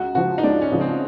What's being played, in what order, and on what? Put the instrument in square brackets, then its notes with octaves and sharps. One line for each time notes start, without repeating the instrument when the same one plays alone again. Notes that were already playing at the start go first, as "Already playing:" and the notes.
Already playing: [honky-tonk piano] C#2 [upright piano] F#4
[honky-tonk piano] C#3 F3 [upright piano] F#4
[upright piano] D#4
[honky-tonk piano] C#2 [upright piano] D4
[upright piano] C#4
[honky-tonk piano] C#3 F3
[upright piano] C4